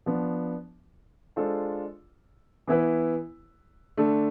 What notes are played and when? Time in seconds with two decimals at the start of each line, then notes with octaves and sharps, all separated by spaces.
0.06 F3 B3 D4
1.36 G#3 D4 F4 A4 C5
2.67 E3 B3 E4 B4
3.97 D3 A3 D4 A4